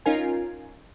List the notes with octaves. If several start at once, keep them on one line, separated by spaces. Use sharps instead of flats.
C#4 D#4 F4 A#4 G#5